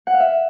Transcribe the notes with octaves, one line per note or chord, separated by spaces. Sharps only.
F#5
F5
E5